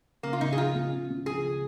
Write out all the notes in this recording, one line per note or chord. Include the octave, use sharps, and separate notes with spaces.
C#3 A#3
F4
C#2 D#4
G#4
F3 F4
C#2
C#3
C#2
F3 G#4